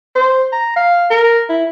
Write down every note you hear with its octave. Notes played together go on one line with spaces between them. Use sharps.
C5
A#5
F5
A#4
E4